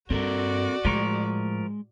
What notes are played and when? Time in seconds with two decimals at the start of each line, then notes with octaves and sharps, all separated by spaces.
0.10 G2 C4 F#4 A4 A#4 D5
0.85 A2 F3 G#3 A#4 C#6